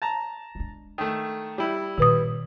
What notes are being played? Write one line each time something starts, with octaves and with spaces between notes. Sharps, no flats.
A5 A#5
G#3 D4
D#3 A3
G3 E4
G2 A#2 D#3 B4 D#6